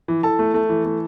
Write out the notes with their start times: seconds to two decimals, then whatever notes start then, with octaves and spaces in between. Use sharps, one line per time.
0.08 E3
0.23 E3 A4 A5
0.39 A3
0.54 A3
0.69 E3
0.85 A3